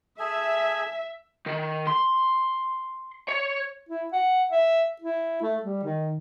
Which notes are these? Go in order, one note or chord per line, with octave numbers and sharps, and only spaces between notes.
G#4 A4 E5 G#5
D#3
C6
C#5
E4
F#5
E5
E4
A3
G3
D#3